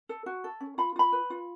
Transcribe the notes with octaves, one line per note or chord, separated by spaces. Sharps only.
A4
F#4
A4
C#4
F4 B5
F4 B5
B4
F4